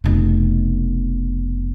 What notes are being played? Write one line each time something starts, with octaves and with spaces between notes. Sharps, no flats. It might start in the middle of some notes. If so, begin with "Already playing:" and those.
F1 B2